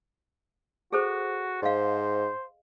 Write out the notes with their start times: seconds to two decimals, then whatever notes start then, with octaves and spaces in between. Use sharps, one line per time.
0.92 F#4 G#4 A4 C5
1.62 G#2 C5 D#5 F5